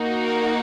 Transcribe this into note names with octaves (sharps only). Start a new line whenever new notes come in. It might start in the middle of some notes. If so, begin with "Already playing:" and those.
Already playing: A#3 D#4 F#4
A#4